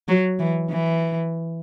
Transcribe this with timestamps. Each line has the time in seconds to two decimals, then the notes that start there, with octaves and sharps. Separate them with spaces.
0.09 F#3
0.39 E3
0.70 E3